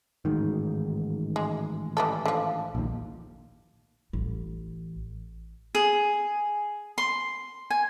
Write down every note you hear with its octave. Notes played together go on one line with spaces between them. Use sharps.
A1 G#2 D#3
G#3
E3 G3 A4
D3 F3
A#1 D#2
A1
G#4
C6
G#5